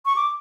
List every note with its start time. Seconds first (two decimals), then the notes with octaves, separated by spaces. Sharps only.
0.06 C#6
0.16 D6